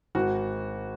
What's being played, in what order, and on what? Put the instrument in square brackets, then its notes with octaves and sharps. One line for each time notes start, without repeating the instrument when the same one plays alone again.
[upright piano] G#1 F#4